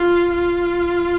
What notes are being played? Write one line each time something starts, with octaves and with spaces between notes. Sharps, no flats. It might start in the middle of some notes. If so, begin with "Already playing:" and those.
Already playing: F4
F4